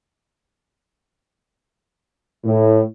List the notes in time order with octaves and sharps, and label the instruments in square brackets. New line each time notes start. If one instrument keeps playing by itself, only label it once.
[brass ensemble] A2